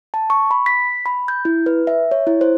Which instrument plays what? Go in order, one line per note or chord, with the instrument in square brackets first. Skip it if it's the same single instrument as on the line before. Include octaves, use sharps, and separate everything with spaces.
[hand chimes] A5
C#6
B5
B6
B5
G6
E4
B4
E5
C#5
E4
C5